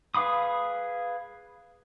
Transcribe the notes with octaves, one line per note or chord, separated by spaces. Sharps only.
G#4 B4 F5 B5 D#6